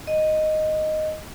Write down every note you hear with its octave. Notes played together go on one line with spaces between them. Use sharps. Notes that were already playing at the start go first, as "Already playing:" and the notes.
D#5